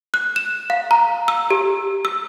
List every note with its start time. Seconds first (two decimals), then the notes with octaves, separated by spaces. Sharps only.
0.14 F#6
0.36 E7
0.70 F5
0.91 A#5
1.28 E6
1.51 G4
2.05 E6